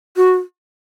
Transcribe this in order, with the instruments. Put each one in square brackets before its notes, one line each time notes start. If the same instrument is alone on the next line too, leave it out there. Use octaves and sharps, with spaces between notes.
[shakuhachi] F#4